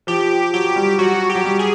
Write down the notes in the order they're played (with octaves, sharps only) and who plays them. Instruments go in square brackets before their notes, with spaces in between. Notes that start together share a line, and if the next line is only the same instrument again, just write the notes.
[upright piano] F3 [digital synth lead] G4
[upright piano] F#3 [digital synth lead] G4
[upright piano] G3
[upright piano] F#3 [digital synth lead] F#4
[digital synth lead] G4
[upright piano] F#3
G3
[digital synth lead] G#4